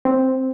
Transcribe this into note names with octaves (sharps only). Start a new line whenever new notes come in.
C4